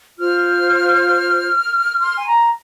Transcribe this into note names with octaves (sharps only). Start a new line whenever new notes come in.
F4 C5 F6
C6
G#5
A#5